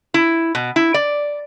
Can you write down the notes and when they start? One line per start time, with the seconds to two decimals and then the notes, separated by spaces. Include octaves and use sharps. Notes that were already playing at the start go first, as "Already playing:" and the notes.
0.14 E4
0.55 B2
0.76 E4
0.94 D5